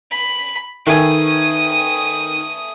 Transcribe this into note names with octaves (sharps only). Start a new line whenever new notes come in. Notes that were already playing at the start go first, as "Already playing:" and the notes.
B5
D#3 A3 B4 G#5 D#6